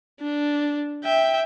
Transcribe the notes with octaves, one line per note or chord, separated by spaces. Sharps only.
D4
E5 G5